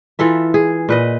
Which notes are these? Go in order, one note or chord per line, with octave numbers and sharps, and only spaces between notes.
E3 F4 A4 E5
G#4
A#2 B4 D#5